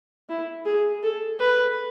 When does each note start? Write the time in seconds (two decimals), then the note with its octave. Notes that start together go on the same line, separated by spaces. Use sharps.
0.29 E4
0.66 G#4
1.03 A4
1.39 B4